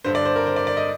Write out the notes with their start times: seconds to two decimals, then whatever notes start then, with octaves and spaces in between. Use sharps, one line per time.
0.04 G2 D3 C5
0.15 D5
0.25 C5
0.36 A#4
0.46 C5
0.56 D5
0.67 D5
0.77 D#5